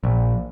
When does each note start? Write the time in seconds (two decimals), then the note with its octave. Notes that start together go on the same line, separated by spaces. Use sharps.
0.04 A#1